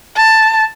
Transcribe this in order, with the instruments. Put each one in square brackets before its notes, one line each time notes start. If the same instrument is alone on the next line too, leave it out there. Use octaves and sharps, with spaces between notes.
[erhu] A5